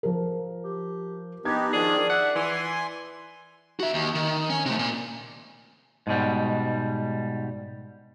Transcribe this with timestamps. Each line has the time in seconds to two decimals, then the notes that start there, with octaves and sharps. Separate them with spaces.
0.03 F3 A#4
0.64 G4
1.45 B3 D4 D#4 G4 G#6
1.73 D#3 F3 D4 G#4 D5
2.10 E5 F#5
2.35 E3 G#5 C6
3.80 F#4 E5
3.94 D#2
4.15 D#3
4.50 C#4
4.66 C3 A3
4.79 A#2
6.07 G#2 B2 G3